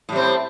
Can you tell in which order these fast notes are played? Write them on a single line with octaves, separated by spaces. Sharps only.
A2 G3 C4